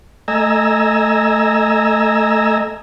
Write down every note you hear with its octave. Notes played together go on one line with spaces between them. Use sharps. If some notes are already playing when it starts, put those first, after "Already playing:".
A3 D#5 G#5 A#5 E6